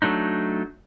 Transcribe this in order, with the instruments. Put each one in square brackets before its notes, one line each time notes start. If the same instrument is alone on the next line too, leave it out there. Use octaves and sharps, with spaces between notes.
[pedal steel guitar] F#3 A3 D4 D#4